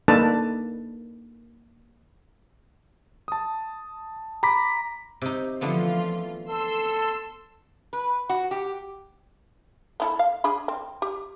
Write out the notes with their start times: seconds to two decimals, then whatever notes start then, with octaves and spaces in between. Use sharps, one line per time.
0.08 A#3 D4 D#4 A4 B4 A5
3.28 A5 D#6
4.43 A#5 B5 D6 B6
5.22 C3 D#4
5.61 D3 E3 F3 A3 B3 F4
6.49 A4 C6 E6
7.93 B4
8.29 F#4
8.51 G4
10.00 B3 E4 A4
10.19 F5
10.44 D4 G#4 B5
10.68 C4
11.02 G4